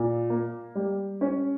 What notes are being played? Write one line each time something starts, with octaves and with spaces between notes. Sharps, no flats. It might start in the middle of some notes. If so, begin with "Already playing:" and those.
Already playing: A#2
A#3
G3
C#4